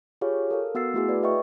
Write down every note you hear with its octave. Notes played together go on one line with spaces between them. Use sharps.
F4 G4 G#4 C#5 F5
A4 A#4 F5
B3 F#4 F5 E6 A6 C7
A3 E4 F#4 G#4
B4 D5
B4 D#5 E5 G5 C#6